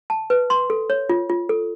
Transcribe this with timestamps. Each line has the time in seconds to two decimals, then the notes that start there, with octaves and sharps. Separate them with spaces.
0.10 A5
0.30 B4
0.50 C6
0.70 A4
0.90 C#5
1.09 F4
1.29 F4
1.49 A4